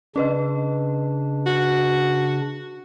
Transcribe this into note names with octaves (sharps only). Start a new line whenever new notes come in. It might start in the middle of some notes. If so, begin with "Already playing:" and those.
C#3 C#4 D4 B4 D#5
F#4